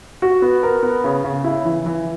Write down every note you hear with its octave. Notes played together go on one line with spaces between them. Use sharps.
F#4
B3
A#4
B3
C#3
C#3
E4
E3
E3